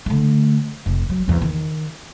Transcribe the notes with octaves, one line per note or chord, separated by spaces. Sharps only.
D3 A3
F1
F#3
E2 B3
D#3